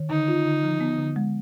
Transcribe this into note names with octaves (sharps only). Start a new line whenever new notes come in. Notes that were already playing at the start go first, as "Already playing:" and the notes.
Already playing: D#3
D3 D#4
F4
D3
F3
B3
D3
G#3